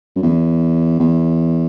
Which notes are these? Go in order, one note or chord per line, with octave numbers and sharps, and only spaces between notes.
F#2
E2
E2